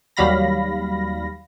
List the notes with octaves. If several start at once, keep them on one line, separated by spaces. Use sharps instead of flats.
D#2 F#3 G3 F5 B5 A#6